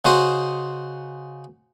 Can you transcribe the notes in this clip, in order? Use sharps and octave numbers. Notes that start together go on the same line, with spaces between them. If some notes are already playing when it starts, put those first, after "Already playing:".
C#3 D#4 F#4 C5 D#6